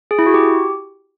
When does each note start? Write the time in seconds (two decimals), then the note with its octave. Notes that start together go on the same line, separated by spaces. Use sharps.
0.11 G#4
0.19 E4
0.26 F#4
0.34 G4